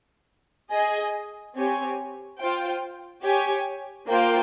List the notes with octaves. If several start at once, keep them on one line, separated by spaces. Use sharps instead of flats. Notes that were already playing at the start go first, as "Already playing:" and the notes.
G#4 D#5 G#5
C4 G4 C#5 G#5
F4 C5 G5
G4 C#5 G#5
A#3 F4 C5 G5